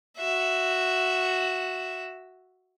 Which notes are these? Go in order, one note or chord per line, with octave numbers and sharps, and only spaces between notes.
F#4 E5